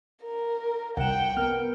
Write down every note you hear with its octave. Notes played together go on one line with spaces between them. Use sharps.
A#4
C2 F#5 G5 E7
B3 A#4 F6